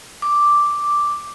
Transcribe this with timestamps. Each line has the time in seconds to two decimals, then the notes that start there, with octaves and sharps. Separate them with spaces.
0.22 D6